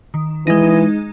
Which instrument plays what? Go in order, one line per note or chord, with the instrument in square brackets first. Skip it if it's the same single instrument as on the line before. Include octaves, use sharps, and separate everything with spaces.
[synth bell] D#3
[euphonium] E3 [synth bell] G#3 D#4